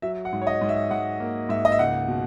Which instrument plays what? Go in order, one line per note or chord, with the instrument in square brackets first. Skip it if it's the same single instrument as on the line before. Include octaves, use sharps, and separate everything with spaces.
[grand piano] F#3 E5
F#5
G#2
C#5
D#5
G#2
E5
G#2 F#5
A#3
G#2 E5
D#5
E5
C#2 F#5
B2